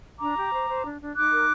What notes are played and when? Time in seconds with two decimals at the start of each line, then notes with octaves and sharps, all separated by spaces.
0.20 D4 A#5 D6
0.36 G4
0.52 C5
0.68 C5
0.84 D4
1.00 D4
1.16 D#4 D6 F#6
1.32 A#4